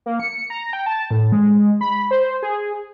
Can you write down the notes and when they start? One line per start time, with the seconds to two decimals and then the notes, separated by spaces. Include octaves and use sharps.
0.06 A#3
0.20 C#7
0.50 A#5
0.73 G5
0.86 A5
1.11 A2
1.32 G#3
1.81 B5
2.11 C5
2.43 G#4